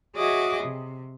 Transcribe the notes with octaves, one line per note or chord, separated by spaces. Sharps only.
F#4 G#4 C#5 D#5 E5 D6
C3